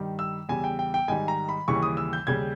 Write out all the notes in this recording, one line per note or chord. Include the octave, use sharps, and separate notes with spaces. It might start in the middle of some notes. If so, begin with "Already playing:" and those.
Already playing: G2 D#3 G3
E6
E2 C#3 G3 G#5
G5
G5
G5
G#2 D#3 G3 G#5
A#5
B5
D#2 C#3 E3 G3 C#6
D#6
E6
G6
D#2 C#3 G3 G#6